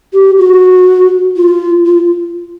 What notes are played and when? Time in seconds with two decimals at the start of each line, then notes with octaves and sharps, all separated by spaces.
0.14 G4
0.38 F#4
1.37 F4
1.86 F4